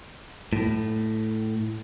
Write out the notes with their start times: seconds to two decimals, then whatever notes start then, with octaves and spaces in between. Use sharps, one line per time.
0.53 A2